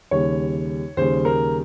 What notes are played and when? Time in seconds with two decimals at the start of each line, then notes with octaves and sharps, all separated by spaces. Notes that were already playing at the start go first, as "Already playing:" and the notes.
0.11 D#2 C#3 G3 C#5
0.97 D#2 C#3 G3 C5
1.25 A#4